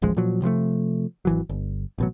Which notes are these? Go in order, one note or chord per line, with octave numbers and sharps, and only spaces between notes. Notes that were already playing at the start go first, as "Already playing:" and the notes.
D#1 A1 F3 G#3
A#2 F3 F#3
C3 F3 G#3 A3
G#1 E3 F#3
G1
A1 B2 F#3